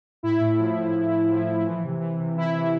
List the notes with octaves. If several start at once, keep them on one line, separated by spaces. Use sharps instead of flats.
A2 E4
A2
F3
F3
A2
A2
F3
F3
E3
C3
E3
C3
E3 E4
E3